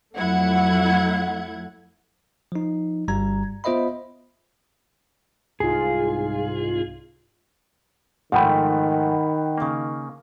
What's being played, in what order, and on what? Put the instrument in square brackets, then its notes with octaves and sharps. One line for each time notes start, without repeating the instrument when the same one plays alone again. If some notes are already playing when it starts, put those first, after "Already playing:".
[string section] F2 F#3 A3 E4 F#5 G#6
[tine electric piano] F3 D#4
G1 G2 G3 A#5 G#6
B3 F4 C5 D#5 E5 B5
[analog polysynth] C2 G#2 F4 [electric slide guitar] G#4
[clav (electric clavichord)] G#2 F3 A3 [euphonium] D#3 [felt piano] F#5 G5 B5
[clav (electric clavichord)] C#3 A#3